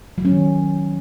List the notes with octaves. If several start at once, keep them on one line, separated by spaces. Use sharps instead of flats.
F#3
C#4
D#3